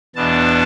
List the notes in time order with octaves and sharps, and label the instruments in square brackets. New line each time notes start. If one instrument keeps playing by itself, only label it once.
[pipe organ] E2 B2 B3 D4 A5